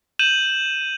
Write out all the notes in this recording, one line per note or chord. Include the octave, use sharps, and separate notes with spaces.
G6 D#7 E7 F#7